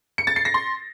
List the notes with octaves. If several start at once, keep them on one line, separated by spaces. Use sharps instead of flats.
C#7
A6
C7
A#6
C6